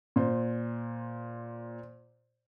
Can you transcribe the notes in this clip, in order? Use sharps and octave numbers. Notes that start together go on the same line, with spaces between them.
A#2 C5